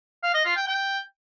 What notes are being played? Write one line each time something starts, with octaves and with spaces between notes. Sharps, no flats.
F5
D#5
F4
G5
G5